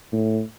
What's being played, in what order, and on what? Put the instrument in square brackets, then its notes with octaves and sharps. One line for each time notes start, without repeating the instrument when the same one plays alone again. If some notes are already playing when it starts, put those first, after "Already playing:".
[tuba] A2